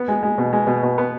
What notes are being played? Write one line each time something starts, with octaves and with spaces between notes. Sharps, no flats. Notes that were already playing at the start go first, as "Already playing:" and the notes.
Already playing: B3
G#3
G#3
B2
G#3
B2
B2
B3